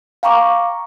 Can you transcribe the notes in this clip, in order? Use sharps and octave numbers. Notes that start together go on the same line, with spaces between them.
F5 G5 A#5 C#6 D6